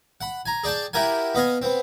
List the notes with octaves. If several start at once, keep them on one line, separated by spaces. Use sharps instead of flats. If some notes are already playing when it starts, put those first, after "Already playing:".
F#5 B5
G#5 A#5
G#4 D5 G5 A5
E4 G4 A#4 F#5 G#5
B3 D#5 F5 G#5
B3 C4